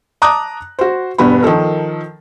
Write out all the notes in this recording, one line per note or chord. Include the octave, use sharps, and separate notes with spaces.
A5 A#5 D6 D#6 F#6
F#4 C5
E1 G2 B3 B5
D#3 F3 A4 A#4